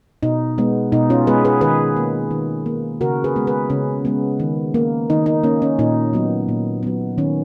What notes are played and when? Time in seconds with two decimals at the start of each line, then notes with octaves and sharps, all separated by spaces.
0.23 B2 D#4
0.58 G#3 B3
0.92 B2 D#4
1.10 C#4 F4
1.27 G#3 B3 G#4 B4
1.45 G#4 B4
1.61 D#3 G#4 B4
1.96 A#3
2.31 D#3
2.66 A#3
3.01 C#3 F#4 A#4
3.24 G#4 B4
3.36 G#3 B3
3.47 G#4 B4
3.70 C#3 C#4
4.05 G#3 B3
4.40 D#3
4.74 A#3
5.10 D#3 D#4
5.26 D#4
5.43 A#3 C#4
5.62 C#4
5.79 A#2 D#4
6.13 F#3 B3
6.49 A#2
6.83 F#3 B3
7.18 D#3 C#4